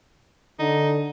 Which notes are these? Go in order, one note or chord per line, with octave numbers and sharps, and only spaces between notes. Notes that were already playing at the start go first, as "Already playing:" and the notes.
D3 D#4